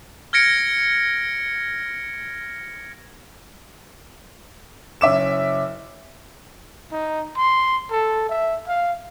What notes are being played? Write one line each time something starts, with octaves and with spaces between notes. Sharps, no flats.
F6 G#6 A#6 C#7 D7
F#1 C#4 E5 D6 E7
D#4
C6
A4
E5
F5